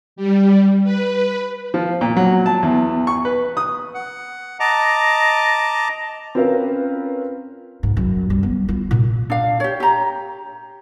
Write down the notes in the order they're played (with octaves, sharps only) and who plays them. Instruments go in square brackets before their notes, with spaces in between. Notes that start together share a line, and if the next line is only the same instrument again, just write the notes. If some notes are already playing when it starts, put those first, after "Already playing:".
[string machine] G3
B4
[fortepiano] F3
A#2
F#3
A5
E2
C#6
B4
D#6
[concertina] F#5
D#5 A5 A#5 D6
[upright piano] C4 C#4 F4 A#4 B4 F5
[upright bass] G#2
F#2
G3
B3
F4
A#2
[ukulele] D4 F5
G4 C#5
G4 A#5